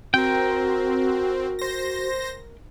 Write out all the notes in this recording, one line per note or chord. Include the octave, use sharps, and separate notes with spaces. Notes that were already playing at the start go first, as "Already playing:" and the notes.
C4 F#4 A#4 G5
C5 A#6